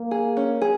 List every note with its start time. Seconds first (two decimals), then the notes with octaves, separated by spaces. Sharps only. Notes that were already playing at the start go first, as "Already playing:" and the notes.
Already playing: A#3
0.11 G#4
0.37 C#4
0.62 G#4